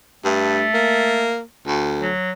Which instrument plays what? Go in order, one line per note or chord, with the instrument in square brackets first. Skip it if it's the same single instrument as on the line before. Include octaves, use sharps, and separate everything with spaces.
[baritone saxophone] G2 [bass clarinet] A3
[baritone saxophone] A#3
D2
[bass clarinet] F#3